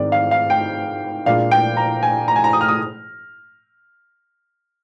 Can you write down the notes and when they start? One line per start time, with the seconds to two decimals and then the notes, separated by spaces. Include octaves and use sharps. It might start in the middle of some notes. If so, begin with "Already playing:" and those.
Already playing: G#2 D#3 G#3 C4 D5
0.12 F5
0.31 F5
0.50 G5
1.26 A#2 G#3 D4 F5
1.51 G5
1.77 A#5
2.03 G#5
2.28 A#5
2.36 G#5
2.44 A#5
2.53 D#6
2.61 F6
2.68 D#6